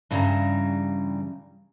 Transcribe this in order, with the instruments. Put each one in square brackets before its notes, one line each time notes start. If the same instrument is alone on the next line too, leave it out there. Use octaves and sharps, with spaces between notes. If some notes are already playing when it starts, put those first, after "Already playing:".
[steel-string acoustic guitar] G2 C#3 E3 G3 F#4 A#5